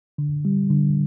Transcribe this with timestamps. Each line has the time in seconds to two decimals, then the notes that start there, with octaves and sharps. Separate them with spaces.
0.18 D3
0.45 G3
0.70 D3